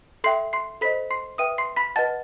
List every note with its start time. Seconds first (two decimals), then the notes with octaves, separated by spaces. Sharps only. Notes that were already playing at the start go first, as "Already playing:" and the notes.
0.24 A4 E5 G5 C6 C7
0.53 C6 C7
0.81 A4 C5 D#5 B5 B6
1.11 C6 C7
1.38 B4 E5 G5 D#6 D#7
1.58 C6 C7
1.76 B5 B6
1.96 B4 D#5 F#5 A5 A6